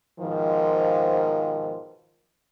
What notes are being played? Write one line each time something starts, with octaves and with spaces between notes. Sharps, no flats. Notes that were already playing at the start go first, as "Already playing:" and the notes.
G#2 B2 D#3 F3